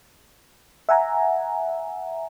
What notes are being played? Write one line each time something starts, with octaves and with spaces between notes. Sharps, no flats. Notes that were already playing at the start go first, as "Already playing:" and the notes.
E5 F#5 G#5 A#5